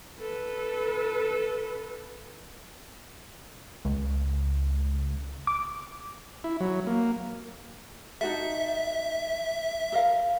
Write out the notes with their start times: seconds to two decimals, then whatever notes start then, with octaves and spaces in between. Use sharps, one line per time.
0.20 A4 B4
3.85 C#2
5.47 D6
6.44 E4
6.60 F#3
6.87 A#3
8.21 D#4 F#4 A4 E5
9.92 A4 A#4 F5